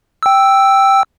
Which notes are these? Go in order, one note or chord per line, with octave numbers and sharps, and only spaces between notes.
G5 E6